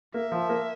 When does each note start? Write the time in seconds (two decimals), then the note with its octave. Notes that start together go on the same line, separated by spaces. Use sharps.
0.14 A#3 E5
0.32 F3
0.49 A#3